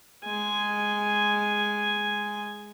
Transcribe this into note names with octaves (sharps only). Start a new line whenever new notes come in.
G#3 G#5